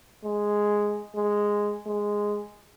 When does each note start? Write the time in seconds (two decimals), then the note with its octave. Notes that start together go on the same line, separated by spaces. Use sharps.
0.25 G#3
1.16 G#3
1.87 G#3